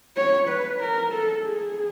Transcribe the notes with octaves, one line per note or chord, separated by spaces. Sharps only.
C#5
B4
A#4
A4
G#4